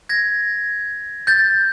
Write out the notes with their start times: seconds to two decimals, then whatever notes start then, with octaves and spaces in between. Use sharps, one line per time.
0.09 G#6 A#6
1.27 G6 A6